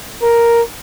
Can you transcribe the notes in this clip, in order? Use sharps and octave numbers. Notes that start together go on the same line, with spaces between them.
A#4